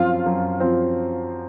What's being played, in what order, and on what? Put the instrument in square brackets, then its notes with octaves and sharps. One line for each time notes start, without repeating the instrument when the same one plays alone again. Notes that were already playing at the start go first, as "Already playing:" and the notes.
Already playing: [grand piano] F#2 F3 C4 [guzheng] F4
[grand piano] F#2
F3 C4